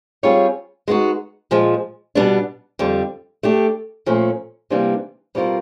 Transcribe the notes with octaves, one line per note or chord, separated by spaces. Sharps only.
G3 C4 F4 G#4 C#5
G#3 B3 D#4 F#4
A#2 F3 G#3
B2 G3 B3 D4
F2 D3 G3
A3 D4 G4
A#2 F3 A3 C#4
C3 E3 G3 A#3 D4
B2 G3 C4 F4 A#4